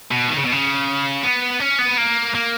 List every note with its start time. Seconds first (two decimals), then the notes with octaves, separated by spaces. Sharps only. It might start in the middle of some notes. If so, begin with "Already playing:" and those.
0.12 B2
0.29 D#3
0.37 C#3
0.46 B2
0.53 C#3
1.23 B3
1.60 C#4
1.79 B3
1.97 A#3
2.35 A#3